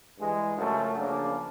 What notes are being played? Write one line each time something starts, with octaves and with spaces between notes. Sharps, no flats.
G2 E3 G#3
F#2 C#3 F3 A3
C#3 F3 A#3 D4